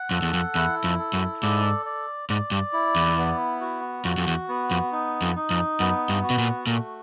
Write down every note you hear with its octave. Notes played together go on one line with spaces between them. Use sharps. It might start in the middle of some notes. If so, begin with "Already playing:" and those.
Already playing: F#5
F2 A4
E2
F2
E2 E4
F2
A4
F#2
G#2 D5
D5
G#2 D5
G2
E4
E2
B3
F#4
F2 F#4
F2
E2
B3
F2
D#4
F2
D#4
F2
F#2 B3
G2
F#4
B2
A#2
A#2 A3